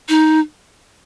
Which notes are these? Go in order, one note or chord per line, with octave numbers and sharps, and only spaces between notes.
D#4